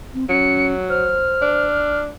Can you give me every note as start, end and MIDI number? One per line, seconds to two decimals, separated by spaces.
0.14 0.25 60
0.29 1.19 54
0.29 0.73 61
0.29 0.66 97
0.90 1.67 72
0.90 2.00 89
1.42 2.11 62